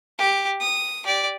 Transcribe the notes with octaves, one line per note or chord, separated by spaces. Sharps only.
G4
D#6
G4 D5